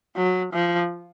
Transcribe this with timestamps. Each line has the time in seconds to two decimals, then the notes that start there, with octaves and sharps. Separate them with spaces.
0.17 F#3
0.53 F3